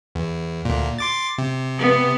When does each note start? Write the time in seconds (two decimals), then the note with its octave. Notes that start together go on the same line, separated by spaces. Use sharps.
0.15 E2
0.65 D2 A#2
0.98 C6 D6 A6
1.38 C3
1.79 B3